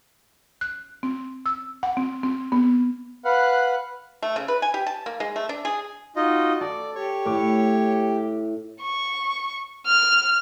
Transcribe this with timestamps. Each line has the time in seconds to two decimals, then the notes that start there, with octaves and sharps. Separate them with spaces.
0.61 F#6
1.03 C4
1.46 E6
1.83 F#5
1.97 C4
2.23 C4
2.52 B3
3.25 B4 F5 F#5
4.23 A3
4.36 C#3
4.48 B4
4.62 G#5
4.74 G4
4.86 A5
5.06 A#3
5.20 G#3
5.36 A3
5.49 D4
5.65 G#4
6.16 D#4 F4 F#4 D#5
6.61 A4 D5
6.95 G4 C#5 C#6
7.26 A2 D6
8.82 C#6
9.86 F6